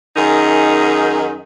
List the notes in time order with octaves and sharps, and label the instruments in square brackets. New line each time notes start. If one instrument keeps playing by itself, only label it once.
[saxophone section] F#2 D#3 D#4 G#4